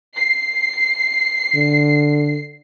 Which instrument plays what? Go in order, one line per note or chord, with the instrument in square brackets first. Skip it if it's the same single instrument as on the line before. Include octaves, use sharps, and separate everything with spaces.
[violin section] C7
[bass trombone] D3